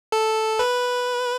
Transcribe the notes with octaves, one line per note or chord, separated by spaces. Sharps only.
A4
B4